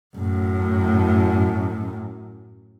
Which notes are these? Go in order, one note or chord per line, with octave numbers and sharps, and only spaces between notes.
F#2 A2